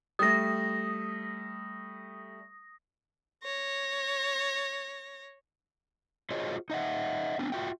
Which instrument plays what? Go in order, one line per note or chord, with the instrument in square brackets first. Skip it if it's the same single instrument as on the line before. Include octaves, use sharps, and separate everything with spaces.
[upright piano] G3 A3 [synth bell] D#6 A#6
[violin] C#5 A#6
[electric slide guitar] F4 F#4 G#4 C5 C#5 D#5
D#4 D#5 E5 F#5
B3 C4 D4
F4 F#4 E5 G5